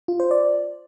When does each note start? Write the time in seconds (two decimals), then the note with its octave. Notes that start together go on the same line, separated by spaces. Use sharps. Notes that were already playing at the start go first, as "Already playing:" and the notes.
0.08 F4
0.20 C5
0.31 D5